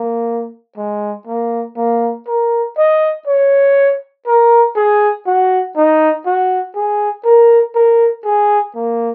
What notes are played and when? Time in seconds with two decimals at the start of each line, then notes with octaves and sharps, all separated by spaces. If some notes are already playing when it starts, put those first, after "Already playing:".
Already playing: A#3
0.78 G#3
1.27 A#3
1.77 A#3
2.28 A#4
2.78 D#5
3.27 C#5
4.27 A#4
4.76 G#4
5.27 F#4
5.76 D#4
6.26 F#4
6.75 G#4
7.25 A#4
7.75 A#4
8.25 G#4
8.75 A#3